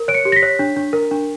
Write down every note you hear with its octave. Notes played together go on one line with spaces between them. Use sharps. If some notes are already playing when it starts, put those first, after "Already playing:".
Already playing: A#4
C#5 D7
C#7
G4
A#6
B6
C#5
D4
D4
A#4
D4